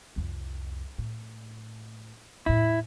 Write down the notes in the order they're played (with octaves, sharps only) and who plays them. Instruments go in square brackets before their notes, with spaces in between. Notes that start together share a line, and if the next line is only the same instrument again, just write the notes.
[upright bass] C2 F2
A2
[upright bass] E2 A2 [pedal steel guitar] E4